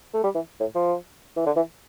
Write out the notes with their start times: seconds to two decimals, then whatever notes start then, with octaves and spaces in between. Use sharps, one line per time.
0.14 A3
0.24 G3
0.35 E3
0.60 A2
0.75 F3
1.37 E3
1.46 D3
1.56 E3